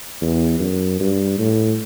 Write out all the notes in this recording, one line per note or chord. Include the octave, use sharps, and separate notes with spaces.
E2
F#2
G2
A2